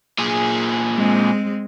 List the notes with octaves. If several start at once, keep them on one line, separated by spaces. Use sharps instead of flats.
A#2 G#4
G#3 C4